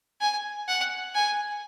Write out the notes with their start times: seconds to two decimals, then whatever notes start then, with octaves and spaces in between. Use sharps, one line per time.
0.21 G#5
0.68 F#5
1.15 G#5